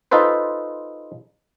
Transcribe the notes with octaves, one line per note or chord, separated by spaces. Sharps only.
D#4 F4 A4 B4 C5